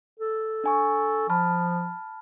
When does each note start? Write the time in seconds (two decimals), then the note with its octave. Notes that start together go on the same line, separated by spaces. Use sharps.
0.20 A4
0.64 D4 G#5 C#6
1.30 F3 A5 B5 F6